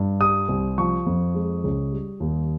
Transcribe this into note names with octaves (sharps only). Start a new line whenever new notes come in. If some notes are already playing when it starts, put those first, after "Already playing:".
Already playing: G2
G3 D#6
C2
F3 C#6
F2
G#3
C#2
G3
D#2